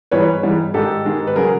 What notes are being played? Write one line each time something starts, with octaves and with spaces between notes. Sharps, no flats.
G#2 E3 G3 B4 C#5
G#2 E3 G3
G#2 D#3 G#3 G4 A4
G#2 D#3 G#3
B4
C#3 F#3 G#4 A#4